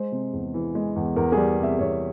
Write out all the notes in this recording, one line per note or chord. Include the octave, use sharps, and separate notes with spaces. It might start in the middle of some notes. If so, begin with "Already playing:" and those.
Already playing: G#3 C5
C3
E2
E3
G#3
E2
E2 A#4
G3 G#4
C3 E5
E2 C#5